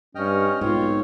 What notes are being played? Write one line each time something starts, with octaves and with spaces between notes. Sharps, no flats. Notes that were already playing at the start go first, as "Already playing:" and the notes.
G2 C#4 D#5 G5 F6
B1 G#2 C4 F4 C#5